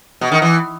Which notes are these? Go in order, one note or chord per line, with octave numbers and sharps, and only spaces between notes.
B2
D#3
E3